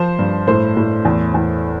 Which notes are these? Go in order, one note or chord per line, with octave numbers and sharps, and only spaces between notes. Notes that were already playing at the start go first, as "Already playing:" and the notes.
Already playing: F3 C5
G2
A2 C5
A2
E2
E2